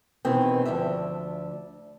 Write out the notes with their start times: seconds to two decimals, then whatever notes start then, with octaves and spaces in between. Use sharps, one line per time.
0.25 B2 D#3 E3 G#3 C4
0.65 D2 F3 D4 E5